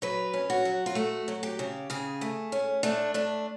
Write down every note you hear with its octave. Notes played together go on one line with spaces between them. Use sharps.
F#3 B4
C#4
F#4
F#3
F4
A3 F#4
F#3
G4
C#3
C#3 G#4
A3
C#4
A3 D4
A3 D4